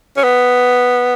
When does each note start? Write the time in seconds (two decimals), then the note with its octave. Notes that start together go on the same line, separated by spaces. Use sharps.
0.17 C#4
0.24 B3